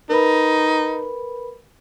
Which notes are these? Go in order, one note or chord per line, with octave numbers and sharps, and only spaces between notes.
D#4 A#4 B4 B5